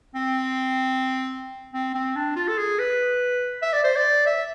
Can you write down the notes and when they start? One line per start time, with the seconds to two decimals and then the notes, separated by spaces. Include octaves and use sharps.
0.15 C4
1.73 C4
1.95 C4
2.16 D4
2.36 F4
2.48 A4
2.58 G#4
2.79 B4
3.62 E5
3.73 D5
3.84 C5
3.96 D5
4.26 E5